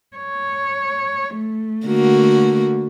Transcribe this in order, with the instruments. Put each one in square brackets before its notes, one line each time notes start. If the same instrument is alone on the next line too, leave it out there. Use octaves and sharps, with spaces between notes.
[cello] C#5
A3
[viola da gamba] D3 A#3 F#4